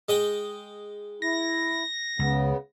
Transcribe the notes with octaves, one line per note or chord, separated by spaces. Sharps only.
G#3 D#5 G5
E4 A#6
C#2 C#3 B3